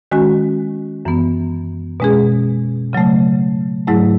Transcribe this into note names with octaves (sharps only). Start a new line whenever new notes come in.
D#3 G#3 C#4 F#4
F#2 E3 B3
B2 G#3 C#4 G#4
C#3 F#3 A3
G#2 F#3 A3 E4